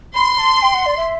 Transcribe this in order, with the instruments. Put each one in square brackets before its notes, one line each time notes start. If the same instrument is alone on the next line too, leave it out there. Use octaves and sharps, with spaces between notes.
[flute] B5 [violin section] C6
[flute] A5
G5
F#5
D5
E5